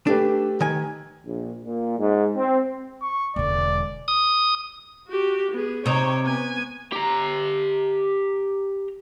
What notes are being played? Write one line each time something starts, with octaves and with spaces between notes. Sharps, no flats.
A3 D4 G4 B4
D#3 G#5
A#1
A#2
G#2
C4
C#6
E1 D3 D5
D#6
F#4 G4
B3 G#4
C3 D#4 C#5 G5
B3 G#5
G4 A#5